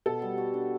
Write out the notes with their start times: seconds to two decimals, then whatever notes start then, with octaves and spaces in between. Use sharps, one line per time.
0.06 B2 A4
0.22 G3
0.38 F#4
0.54 D4